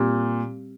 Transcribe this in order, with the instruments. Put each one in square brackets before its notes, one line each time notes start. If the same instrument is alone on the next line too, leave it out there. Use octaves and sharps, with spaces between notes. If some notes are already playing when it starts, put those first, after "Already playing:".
Already playing: [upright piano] A#2 [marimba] G3 C4 G4